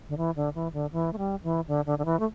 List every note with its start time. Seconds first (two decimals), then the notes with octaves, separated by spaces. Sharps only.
0.09 D3
0.18 E3
0.36 D3
0.55 E3
0.73 D3
0.93 E3
1.13 A3
1.18 G3
1.43 E3
1.68 D3
1.86 D3
1.99 D3
2.05 E3
2.20 A3